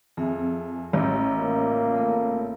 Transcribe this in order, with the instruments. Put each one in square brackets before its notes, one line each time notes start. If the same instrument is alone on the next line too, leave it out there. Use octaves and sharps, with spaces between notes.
[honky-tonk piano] F2 [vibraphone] G#4 E5 G#5
[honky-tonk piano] A1 [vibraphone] D#5 A#5 D6
[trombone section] C#2 A#2 A#3
[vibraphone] A3 B3 A4